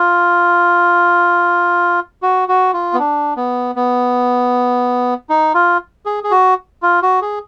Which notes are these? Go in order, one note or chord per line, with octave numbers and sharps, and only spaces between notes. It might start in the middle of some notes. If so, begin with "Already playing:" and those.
Already playing: F4
F#4
F#4
F4
B3
D4
B3
B3
D#4
F4
G#4
G#4
F#4
F4
F#4
G#4